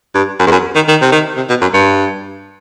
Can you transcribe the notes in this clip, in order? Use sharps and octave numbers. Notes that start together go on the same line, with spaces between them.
G2
F#2
E2
F#2
D#3
D#3
C3
D#3
C3
B2
F#2
G2